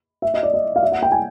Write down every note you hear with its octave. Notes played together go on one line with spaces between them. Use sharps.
E5
D#5
D5
D#5
F5
E5
F#5
G5
G#5